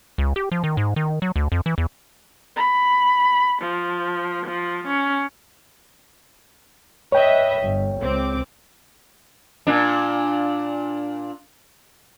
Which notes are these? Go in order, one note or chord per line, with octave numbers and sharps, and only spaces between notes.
C#2
G4
F3
D#3
G#2
D#3
F#3
D2
F2
E3
E2
B5
F3
F3
C#4
B4 C#5 D#5 E5 G5
G1
C#2 C4 D6
A#2 D4